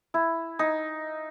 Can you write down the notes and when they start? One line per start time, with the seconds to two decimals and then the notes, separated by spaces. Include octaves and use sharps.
0.14 E4
0.59 D#4